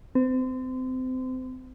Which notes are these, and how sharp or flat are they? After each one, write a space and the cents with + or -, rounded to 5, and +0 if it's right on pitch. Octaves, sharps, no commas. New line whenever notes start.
C4 -30